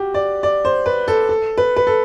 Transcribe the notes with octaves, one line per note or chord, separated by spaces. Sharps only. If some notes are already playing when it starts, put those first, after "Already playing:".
Already playing: F#4 G4
D5
D5
C5
B4
A4
A4
B4
B4
A4